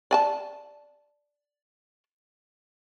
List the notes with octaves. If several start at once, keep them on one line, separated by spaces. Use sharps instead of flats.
D5 G#5 A5